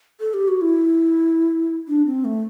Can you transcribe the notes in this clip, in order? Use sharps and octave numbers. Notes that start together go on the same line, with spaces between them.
A4
G4
F#4
E4
D4
C4
A3